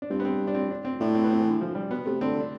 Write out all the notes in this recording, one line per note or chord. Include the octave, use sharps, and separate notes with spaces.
D4
G2 C4
B3
C4
D4
C4
D4
C4
A2 D4
C4
B3
C4
E3
D3
F3
G3
B2 B3
C3 A3
D3 C4
D4